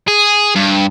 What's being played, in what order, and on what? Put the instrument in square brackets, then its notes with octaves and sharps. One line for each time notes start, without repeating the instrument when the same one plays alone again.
[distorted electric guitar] G#4
G2